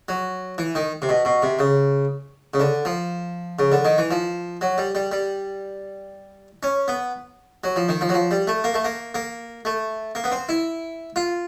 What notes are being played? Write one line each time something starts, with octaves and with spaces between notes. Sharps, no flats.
F#3
E3
D#3
C3
B2
B2
C3
C#3
C#3
D3
F3
C#3
D3
D#3
E3
F3
F#3
G3
G3
G3
C#4
B3
F#3
F3
D#3
F3
F#3
F3
G3
A3
A#3
A3
A#3
A#3
A3
A#3
B3
C4
E4
F4